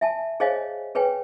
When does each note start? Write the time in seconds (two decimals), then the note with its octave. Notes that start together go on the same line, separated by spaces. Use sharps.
0.01 E5 G#5 A5
0.40 G#4 C5 C#5 D#5 F5 G#5
0.95 G#4 B4 C#5 G5 G#5